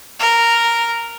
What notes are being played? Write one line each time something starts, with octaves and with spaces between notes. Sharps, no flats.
A#4